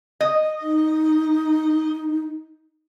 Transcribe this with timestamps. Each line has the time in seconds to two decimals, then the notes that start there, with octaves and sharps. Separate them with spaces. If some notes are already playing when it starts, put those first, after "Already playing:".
0.21 D#5
0.62 D#4